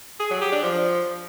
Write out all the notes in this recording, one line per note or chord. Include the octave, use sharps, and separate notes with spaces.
G#4
F#3
G4
D4
F3